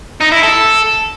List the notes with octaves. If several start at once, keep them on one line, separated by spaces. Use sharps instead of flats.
D#4
E4
A4